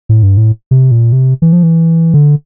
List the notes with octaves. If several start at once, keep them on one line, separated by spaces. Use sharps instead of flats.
A2
G2
A2
C3
A#2
C3
E3
F3
E3
D3